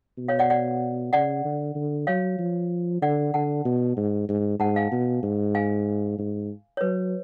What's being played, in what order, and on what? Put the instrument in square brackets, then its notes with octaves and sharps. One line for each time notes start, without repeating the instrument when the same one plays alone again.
[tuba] B2
[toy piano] C#5 F5
D5 F#5
D5 F#5
[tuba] C#3 [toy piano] D5 F#5
[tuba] D3
D3
[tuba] F#3 [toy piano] C#5 F5
[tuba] F3
[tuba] D3 [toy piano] D5 F#5
[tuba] D3 [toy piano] F#5 A5
[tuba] B2
G#2
G#2
[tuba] G#2 [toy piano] F#5 A5
[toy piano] F5 G#5
[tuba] B2
G#2
[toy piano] F5 G#5
[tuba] G#2
[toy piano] C#5
[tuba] F#3 [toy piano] B4